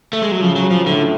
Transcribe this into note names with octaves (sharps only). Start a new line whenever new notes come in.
A3
G#3
F#3
C#3 F3
F#3
F3
A2 D3